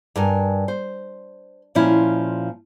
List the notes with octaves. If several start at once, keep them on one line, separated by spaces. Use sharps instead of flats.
G2 A#4 G#5
C5
A#2 F3 C#4 E4